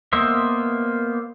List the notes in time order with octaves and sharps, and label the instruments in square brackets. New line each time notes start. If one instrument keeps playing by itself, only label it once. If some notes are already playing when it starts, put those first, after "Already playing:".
[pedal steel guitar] A#3 B3 C5 D#5 E5